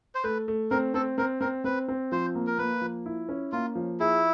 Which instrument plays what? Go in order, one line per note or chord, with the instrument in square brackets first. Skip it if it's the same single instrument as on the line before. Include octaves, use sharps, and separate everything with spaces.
[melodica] C5
[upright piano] A3 [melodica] B4
[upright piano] A3
[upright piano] C4 [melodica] A#4
[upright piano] C4 [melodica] A4
[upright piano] C4 [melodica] A#4
[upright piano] C4 [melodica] A#4
[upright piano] C4 [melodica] B4
[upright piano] C4
[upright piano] F3 [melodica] C5
[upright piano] A#3
[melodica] A#4
[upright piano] A#3 [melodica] B4
[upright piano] F3
E4
C#4
[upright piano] A#3 [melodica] F4
[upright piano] F3
[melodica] E4 [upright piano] G#4